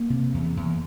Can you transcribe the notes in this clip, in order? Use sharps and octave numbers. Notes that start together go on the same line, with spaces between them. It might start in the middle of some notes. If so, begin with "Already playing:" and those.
Already playing: A#3
C3
E2
E2